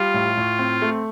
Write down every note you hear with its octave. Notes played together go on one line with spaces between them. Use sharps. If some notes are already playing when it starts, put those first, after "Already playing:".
Already playing: G3 F4
A2
A2
C4
A3